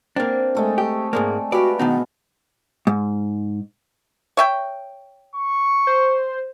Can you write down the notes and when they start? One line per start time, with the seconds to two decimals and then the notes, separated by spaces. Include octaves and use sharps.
0.16 A#3 C4 D4
0.55 G#3 A3 E5
0.78 G4
1.13 G#2 G#3 A#3 D5
1.52 F#4 G4 B4 D5 F5 C#6
1.79 B2 D#3 B3 D4 D#4
2.87 G#2
4.37 C#5 E5 G5
5.35 C#6
5.87 C5